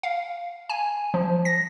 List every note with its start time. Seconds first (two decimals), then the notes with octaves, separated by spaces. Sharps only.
0.03 F5
0.70 G#5
1.14 F3
1.45 A#6